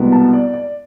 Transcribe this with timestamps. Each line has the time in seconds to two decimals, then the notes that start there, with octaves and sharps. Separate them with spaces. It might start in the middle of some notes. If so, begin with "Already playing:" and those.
Already playing: C2 B2 G#3 B3
0.12 A5
0.33 D5
0.54 D5